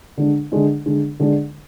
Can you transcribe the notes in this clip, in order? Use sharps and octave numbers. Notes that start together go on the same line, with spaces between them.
D3 G#3 D4
D3 G#3 D4
D3 G#3 D4
D3 G#3 D4